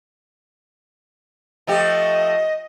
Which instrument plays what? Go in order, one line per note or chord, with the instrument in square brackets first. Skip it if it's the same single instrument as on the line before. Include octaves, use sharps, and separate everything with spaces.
[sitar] F3 A3 G4 [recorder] D#5